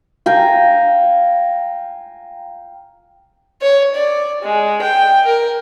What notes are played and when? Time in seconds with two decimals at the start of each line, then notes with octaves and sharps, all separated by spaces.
0.26 F5 G5 G#5 A#5
3.62 C#5
3.95 D5
4.43 G#3
4.82 G5
5.25 A#4